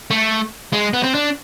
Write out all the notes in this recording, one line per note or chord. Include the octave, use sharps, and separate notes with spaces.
A3
G#3
B3
C4
D4